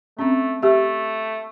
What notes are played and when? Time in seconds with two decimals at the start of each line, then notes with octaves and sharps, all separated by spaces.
0.19 A3 C4 C#4
0.63 A3 G4 E5